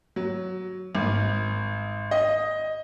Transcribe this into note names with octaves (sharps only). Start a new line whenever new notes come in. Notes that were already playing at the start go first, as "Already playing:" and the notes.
F#3
G#1
D#5